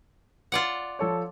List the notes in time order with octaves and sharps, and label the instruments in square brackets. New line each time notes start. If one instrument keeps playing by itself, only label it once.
[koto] F4 D5 F#5
[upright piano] F3 A4 C#5